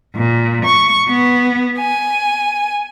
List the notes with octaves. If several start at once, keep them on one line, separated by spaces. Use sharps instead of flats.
A#2
C#6
B3
G#5